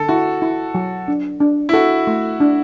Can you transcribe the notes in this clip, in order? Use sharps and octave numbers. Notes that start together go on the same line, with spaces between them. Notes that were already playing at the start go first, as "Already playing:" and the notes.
Already playing: D3 A4
E4 F#4
E4
F#3
D4
D4
E4
F#4 A4
A3
D4